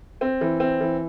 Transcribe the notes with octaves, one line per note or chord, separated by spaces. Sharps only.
C4
E3
C4
E3